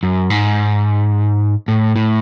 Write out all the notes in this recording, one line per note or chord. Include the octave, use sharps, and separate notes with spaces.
F#2
G#2
A2
A2